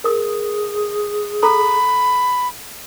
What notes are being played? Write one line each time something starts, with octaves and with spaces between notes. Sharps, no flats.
G#4 A#4 D#6
A4 A#5 B5 D#6